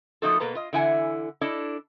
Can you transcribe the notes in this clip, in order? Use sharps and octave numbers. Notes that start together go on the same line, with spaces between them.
F3 A3 A#3 D#4 F#4 A4
B2 A#3 A4 B4 A#5
F4 D#5
D3 E3 E4 F#5 G#5
D4 E4 A4 D#5